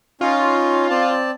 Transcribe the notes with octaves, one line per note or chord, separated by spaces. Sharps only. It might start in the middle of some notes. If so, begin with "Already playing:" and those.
C#4 D#4 F4 C#5
C4 D5 A5